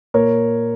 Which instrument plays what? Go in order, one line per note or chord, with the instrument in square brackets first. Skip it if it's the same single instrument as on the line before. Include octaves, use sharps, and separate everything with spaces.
[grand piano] A#2 A#4 C#5